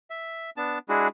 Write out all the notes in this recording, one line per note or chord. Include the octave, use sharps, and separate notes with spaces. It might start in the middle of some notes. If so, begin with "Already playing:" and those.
E5
B3 D4 A5
G#3 D4 E4 F#4 G#4